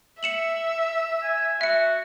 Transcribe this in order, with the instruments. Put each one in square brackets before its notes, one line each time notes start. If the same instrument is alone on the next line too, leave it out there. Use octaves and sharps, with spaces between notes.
[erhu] E5 [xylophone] C#7 E7 F#7
[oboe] G#5
[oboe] F#4 [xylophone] E5 C#7